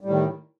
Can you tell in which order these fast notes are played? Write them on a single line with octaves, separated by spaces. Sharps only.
G3 A2 D#3